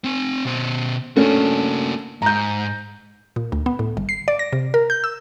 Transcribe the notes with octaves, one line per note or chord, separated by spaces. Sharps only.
C4 G#5
B2 C5
A3 A#3 C#4 D4 F#4
G#2 A#5 G6
A#2
D2
B3
A2
G1
C7
D5
A#6
C3
A#4
G6
E6